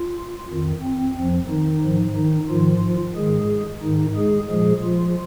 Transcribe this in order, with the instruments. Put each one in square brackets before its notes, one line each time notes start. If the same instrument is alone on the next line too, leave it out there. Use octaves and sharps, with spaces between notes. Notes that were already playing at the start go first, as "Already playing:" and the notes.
Already playing: [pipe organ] F4
F2 D#3
C4
F2 F3
D#3 D#4
G#2 F3
D#3 D#4
G#2 D#3 F3 F4
G#2 D#3 G#3 G#4
G#2 D#3 D#4
G#3 G#4
A#2 F3 G#3 G#4
F3 F4